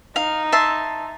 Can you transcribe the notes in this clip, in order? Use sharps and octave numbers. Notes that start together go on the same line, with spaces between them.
D#4 F5
E5 A5 C6